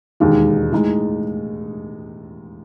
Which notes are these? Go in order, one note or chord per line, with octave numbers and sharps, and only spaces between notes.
E1 D#2 D#3 G#3
A2 G#3 D#4